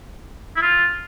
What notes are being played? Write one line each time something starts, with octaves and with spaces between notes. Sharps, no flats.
E4
F4